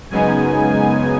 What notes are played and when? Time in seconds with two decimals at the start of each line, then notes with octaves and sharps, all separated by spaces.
0.11 F#2 C#3 G#3 B3 D#4 G#5
0.71 G#5